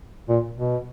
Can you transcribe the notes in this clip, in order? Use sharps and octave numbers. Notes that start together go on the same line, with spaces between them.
A#2
B2